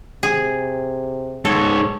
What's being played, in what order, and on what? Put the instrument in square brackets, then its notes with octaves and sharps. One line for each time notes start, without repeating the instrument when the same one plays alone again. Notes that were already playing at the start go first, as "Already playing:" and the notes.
[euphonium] C3 [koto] G#4
[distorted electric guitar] G#2 C#5 [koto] A4